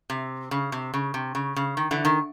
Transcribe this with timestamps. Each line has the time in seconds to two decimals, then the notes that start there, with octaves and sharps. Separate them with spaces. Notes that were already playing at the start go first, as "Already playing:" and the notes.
0.10 C3
0.51 C#3
0.72 C3
0.94 C#3
1.14 C3
1.35 C#3
1.56 C#3
1.77 D#3
1.91 D3 E3
2.05 D#3